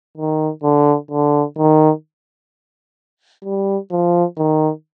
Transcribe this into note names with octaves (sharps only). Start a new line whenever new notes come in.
D#3
D3
D3
D#3
G3
F3
D#3